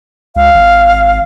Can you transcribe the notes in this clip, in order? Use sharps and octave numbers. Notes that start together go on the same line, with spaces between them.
C#2 F5
G#1